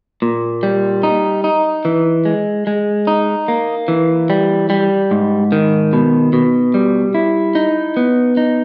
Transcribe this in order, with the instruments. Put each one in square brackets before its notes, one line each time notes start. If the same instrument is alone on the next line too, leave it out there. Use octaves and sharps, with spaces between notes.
[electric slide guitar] A#2
G3
D#4
D#4
E3
G#3
G#3
D#4
A#3
E3
G3
G3
G#2
D#3
B2
B2
G3
E4
D#4
B3
D#4